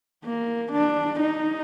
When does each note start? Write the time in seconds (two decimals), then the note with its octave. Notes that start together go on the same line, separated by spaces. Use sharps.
0.25 A#3
0.72 D4
1.20 D#4